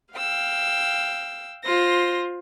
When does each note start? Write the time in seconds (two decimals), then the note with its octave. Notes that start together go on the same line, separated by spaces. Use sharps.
0.14 F5 G5 E6
1.63 F4 C5 A#6